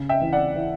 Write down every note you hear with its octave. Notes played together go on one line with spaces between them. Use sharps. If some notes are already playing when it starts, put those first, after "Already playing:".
Already playing: C#3
E5 G5
E3
D5 F#5
E3